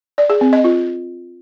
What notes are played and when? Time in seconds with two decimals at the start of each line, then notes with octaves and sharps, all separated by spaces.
0.18 D5
0.30 G#4
0.41 C4
0.53 D#5
0.64 F4